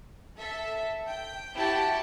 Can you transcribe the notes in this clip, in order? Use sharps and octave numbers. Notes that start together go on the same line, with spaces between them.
A4 E5
G5
E4 F#4 G4 G5 A5